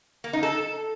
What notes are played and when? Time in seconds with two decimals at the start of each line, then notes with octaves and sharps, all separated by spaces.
0.24 A#3
0.33 D#4
0.43 A4